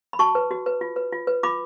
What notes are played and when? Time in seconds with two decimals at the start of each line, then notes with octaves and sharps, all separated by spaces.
0.13 B5
0.19 F#4 A5 C#6
0.35 B4
0.51 F#4
0.66 B4
0.81 F4
0.96 B4
1.12 F4
1.27 B4
1.43 F4 B5 D6